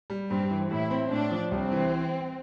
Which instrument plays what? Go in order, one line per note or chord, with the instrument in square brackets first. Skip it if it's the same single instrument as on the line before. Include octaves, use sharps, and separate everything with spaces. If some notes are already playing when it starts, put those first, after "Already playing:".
[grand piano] G3
[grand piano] G2 [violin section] C4
[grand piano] E3
[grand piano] A2 [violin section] E4
[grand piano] C4
[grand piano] A2 [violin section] D4
[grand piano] F3
[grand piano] C2 [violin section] C4
[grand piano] E3